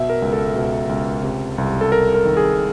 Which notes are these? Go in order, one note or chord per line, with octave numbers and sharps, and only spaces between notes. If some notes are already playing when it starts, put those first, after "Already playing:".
Already playing: B2 E5
A#4
C#2
A4
B2
C#2
C3
C2
A4
C2 A#4
A#4
D#3
G#4